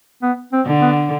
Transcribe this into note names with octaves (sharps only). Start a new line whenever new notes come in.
B3
C4
D3
B3